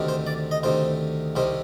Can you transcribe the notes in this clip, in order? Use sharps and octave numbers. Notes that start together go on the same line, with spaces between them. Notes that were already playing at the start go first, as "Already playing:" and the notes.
Already playing: D2 C3 D#3
C5
D5
D#5
D2 C3 D#3 C5
C2 C3 D#3 C5